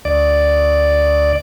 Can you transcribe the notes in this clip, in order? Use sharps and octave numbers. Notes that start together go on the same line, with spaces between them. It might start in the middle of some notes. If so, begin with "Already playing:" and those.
D2 D5